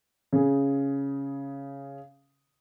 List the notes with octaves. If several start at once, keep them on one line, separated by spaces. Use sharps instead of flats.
C#3 G#4